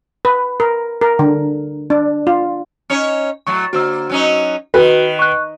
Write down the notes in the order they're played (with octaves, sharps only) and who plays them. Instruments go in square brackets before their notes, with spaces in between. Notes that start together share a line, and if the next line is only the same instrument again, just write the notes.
[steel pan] B4
A#4
A#4
D3
D4
F4
[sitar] C#4 D#4 C#5
[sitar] A2 F#3 A3 [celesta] C#6
[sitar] D3 A#3 [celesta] F#4 C5 E6
[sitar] F#3 C#4 D#4
[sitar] D#3 [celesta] F#4 [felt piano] B4
[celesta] C#6 F#6